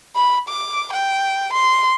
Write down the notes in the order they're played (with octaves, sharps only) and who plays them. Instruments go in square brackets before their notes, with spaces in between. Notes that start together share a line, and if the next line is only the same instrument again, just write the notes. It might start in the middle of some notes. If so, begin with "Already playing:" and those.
[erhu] B5
D6
G5
C6